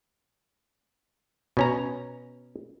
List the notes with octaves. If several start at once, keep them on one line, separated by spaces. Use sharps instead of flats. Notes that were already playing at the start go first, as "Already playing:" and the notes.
B2 C#4 A#5